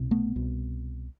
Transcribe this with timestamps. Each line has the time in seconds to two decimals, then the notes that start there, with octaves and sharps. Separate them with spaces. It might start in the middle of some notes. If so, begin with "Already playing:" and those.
Already playing: C2 B2
0.11 A3 B3
0.36 C2 B2